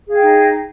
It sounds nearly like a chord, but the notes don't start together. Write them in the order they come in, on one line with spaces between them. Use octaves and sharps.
G#4 F5 G5 D#4